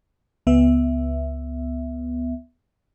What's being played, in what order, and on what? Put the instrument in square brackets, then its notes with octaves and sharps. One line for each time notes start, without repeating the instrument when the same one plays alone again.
[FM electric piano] C#2 B3 E5